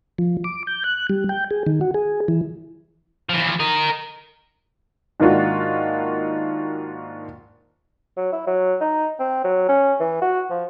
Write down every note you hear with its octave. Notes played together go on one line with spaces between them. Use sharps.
F3
D6
G6
F#6
G3
G5
G#4
D#3
F#4
G#4
E3
E3 F3
A#4 D#5
G#2 D#3 A#3 D4 F4 F#4
F#3
E4
F#3
D#4
C4
F#3
C#4
E3
F#4
F3